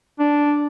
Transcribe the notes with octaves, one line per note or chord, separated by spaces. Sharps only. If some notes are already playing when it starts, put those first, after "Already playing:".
D4